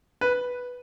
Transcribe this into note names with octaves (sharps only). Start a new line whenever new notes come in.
B4